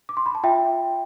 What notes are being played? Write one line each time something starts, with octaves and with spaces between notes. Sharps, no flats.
D6
C6
B5
A5
F4 E5 G5